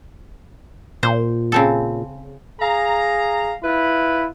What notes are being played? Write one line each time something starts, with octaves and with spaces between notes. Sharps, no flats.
A#2 C5
C#3 C4 A4
G#4 F5 A#5
E4 F4 B4 B5